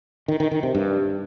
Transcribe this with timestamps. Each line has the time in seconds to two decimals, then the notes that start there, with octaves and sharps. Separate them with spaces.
0.28 D#3
0.40 D#3
0.51 D#3
0.63 C3
0.75 G2